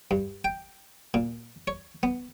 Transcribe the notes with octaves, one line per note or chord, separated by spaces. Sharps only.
G2
G5
A#2
C#5
B3